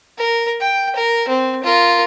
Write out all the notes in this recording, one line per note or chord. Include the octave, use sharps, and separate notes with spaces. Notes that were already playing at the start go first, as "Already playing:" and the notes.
A#4
G5
A#4
C4
F4 A#4